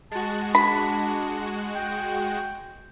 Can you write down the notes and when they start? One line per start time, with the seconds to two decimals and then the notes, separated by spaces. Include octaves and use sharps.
0.11 G#3 F#4 A5
0.55 D4 B5
1.76 G5